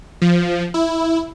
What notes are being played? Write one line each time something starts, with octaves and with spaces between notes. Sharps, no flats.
F3
E4